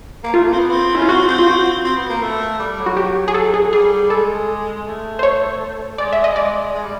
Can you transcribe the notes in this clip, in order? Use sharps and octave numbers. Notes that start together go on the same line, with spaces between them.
A#3
A3 F4
A#3
C4
B3
C4
C#4 E4
F4
C4 F#4
C4
F4
F#4
C4
B3
A#3
A3
G3
F#3
F#4
G4
G#4
A4
G#4
G3 G#4
G#3 A4
A3
C5
C#5
G#3 D5
E5
D#5
G3
G#3 D5
G#3
G3